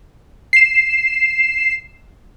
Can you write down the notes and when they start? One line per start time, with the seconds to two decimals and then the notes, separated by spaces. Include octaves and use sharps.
0.53 C7 E7